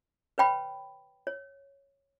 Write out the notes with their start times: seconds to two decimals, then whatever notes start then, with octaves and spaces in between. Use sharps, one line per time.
0.38 B4 C#5 G5 B5
1.27 C#5